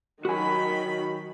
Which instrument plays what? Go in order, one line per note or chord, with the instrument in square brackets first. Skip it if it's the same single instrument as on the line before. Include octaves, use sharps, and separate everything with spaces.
[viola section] D#3 F#3 B5 [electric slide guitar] F#4 G#5